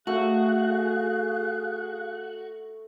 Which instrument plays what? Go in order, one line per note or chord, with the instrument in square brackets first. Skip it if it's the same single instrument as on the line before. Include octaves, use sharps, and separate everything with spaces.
[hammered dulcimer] A3 [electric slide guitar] F#4 [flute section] G#4 F5 F#6